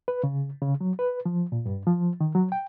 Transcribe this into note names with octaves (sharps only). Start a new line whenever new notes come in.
B4
C#3
C#3
F#3
B4
F3
A#2
G2
F3
D#3
F#3
G5